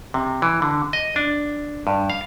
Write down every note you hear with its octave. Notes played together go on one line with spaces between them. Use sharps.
C3
E3
D3
D#5
D4
G2
F5